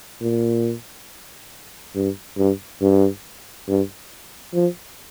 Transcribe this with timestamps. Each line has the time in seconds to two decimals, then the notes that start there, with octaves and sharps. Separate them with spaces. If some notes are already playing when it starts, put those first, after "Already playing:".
0.22 A#2
1.96 G2
2.37 G2
2.81 G2
3.68 G2
4.54 F3